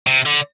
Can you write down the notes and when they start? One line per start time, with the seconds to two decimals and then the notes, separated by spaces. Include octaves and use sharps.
0.07 C3
0.26 D3